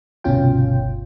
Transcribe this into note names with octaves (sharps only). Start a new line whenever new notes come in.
G1 C2 B2 C#4 F4 G5